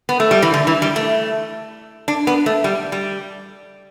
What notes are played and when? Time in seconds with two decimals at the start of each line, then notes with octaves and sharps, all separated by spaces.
0.09 B3
0.20 A3
0.31 G3
0.42 E3
0.54 D3
0.67 E3
0.82 G3
0.96 A3
2.08 D4
2.27 B3
2.46 A3
2.64 G3
2.92 G3